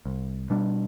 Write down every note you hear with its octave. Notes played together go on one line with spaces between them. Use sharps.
C2
B2 G3 D4